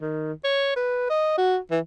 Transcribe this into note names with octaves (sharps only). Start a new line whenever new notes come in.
D#3
C#5
B4
D#5
F#4
E3